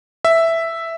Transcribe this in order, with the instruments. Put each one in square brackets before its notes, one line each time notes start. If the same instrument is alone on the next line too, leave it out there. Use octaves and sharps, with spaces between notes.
[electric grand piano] E5